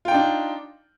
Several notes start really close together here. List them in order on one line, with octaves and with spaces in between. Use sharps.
F4 G5 D#4 D4